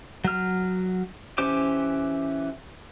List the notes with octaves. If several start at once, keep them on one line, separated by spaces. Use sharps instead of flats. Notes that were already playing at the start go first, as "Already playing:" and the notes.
F#3 F6
E3 C#4 G4 C5 D6